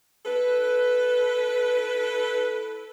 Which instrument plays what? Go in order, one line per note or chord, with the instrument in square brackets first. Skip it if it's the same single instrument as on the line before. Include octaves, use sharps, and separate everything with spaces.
[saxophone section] E4 A4 B4